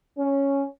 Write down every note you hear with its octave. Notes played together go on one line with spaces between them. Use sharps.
C#4